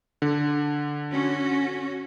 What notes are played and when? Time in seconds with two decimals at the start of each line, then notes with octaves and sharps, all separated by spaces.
0.22 D3
1.11 C#4 F#4